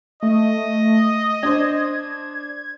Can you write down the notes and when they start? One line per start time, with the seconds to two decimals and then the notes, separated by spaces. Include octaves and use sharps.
0.23 A3 D#5
1.43 D4 C5 G#6